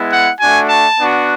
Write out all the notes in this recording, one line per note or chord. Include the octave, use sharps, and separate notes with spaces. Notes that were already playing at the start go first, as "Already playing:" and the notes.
Already playing: G#3 B3 E4
F#5
A3 D4 F#4 G#5
A5
B3 D4 F#4